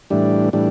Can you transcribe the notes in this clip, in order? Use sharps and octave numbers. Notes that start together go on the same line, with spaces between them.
A2 E3 G3 D4
A2 E3 G3 D4